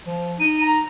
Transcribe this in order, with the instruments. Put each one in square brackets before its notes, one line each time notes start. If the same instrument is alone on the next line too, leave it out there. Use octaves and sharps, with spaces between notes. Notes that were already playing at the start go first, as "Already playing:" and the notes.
[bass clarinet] F3
[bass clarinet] D#4 [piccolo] D#7
[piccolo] A#5